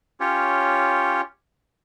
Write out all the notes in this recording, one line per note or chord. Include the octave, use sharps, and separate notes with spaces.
C#4 F4 G4 C#5